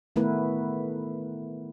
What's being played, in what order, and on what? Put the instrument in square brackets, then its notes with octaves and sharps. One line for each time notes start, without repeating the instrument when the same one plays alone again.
[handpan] D#3 A3 B3 E4 A#4 B4